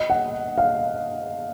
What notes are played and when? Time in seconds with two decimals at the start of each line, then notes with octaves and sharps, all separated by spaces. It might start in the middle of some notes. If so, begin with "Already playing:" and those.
Already playing: D#5
0.10 F#5
0.58 F5